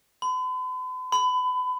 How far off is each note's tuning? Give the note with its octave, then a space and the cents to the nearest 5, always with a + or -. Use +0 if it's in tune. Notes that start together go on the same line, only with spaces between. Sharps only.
B5 +45
B5 +30